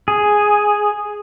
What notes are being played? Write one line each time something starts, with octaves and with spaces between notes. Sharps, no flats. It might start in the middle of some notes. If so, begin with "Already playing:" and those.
G#4